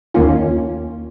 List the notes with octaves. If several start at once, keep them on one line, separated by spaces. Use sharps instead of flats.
D#2 D#3 A#3 C#4 F4